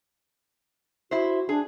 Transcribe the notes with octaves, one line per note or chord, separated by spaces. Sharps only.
E4 F#4 C5
D4 G#4